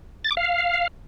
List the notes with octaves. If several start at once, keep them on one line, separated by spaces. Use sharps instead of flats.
A6
D6
F5